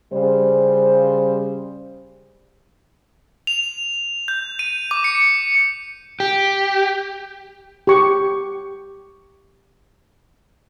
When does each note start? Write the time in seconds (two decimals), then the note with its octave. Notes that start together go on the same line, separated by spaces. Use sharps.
0.13 C#3 G3 C5
3.47 F7
4.28 G6
4.59 D#7
4.91 D6
5.04 C#7
6.20 G4
7.87 G4 C#6